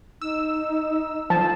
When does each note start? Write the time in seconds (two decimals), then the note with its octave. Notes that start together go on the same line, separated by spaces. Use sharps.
0.21 D#4 E6
1.30 F3 A5